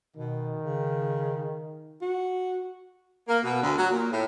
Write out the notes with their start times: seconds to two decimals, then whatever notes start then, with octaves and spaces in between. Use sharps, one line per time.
0.16 B2 D#3
0.62 C#3
2.02 F#4
3.28 A#3
3.43 B2
3.61 D2
3.78 F#3
3.89 A#2
4.11 A2